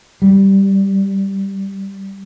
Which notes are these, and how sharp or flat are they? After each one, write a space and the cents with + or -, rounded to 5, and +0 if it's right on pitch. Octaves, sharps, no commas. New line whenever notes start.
G3 -5